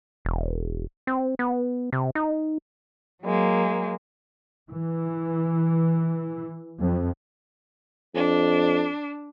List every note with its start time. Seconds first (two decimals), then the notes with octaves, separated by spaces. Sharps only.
0.25 E1
1.07 C4
1.39 B3
1.93 C3
2.15 D#4
3.23 F#3 G#3 A#3
4.70 E3
6.80 F2
8.15 F2 D4